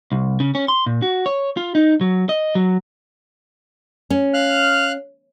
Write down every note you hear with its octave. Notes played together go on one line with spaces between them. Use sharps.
C2
C#3
C#4
C6
A#2
F#4
C#5
F4
D#4
F#3
D#5
F#3
C#4
F5 F6 F#6